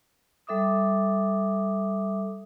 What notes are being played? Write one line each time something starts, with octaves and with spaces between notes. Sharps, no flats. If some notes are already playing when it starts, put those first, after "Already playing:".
G3 A4 E5 D6 D#6